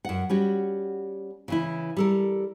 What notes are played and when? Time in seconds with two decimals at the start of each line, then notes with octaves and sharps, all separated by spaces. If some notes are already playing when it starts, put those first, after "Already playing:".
0.05 F#2 F#5
0.30 G3 C#4 F#4
1.48 C#3 E3 E4
1.97 G3 A4 A#4